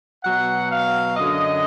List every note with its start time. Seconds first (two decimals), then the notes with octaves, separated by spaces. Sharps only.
0.24 B2 F#3 F#5
0.72 F5
1.17 F#2 D3 F#3 D#5